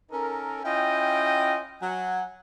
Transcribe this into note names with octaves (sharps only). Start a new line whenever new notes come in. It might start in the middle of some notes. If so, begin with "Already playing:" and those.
C#4 D#4 A4 A#4
C#4 E4 F4 D#5 G5
F#3 F#5 G#5